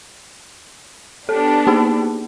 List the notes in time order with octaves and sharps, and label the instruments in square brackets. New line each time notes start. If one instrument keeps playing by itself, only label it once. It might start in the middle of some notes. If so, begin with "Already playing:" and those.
[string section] B3 D4 G4 [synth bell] A4
[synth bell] A#3 D#4 G#4